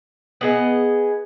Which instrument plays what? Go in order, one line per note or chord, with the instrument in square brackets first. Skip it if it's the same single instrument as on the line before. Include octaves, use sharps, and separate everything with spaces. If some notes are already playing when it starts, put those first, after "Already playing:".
[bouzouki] B3 G#4 D#5